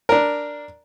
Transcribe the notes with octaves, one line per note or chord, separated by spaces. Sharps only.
D4 A#4